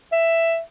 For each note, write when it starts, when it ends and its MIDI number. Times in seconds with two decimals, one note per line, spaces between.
0.12 0.61 76